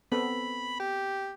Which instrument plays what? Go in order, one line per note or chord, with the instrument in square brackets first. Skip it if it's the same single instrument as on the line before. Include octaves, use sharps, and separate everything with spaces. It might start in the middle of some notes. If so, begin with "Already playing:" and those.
[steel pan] B3 C4 A4 [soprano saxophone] B5
[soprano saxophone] G4